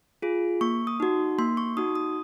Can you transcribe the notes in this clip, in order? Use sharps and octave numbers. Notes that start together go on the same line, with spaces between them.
F4 G#4
A#3 C#6
D#6
D#4 F#4
A#3 C6
C#6
D#4 F#4 D#6
D#6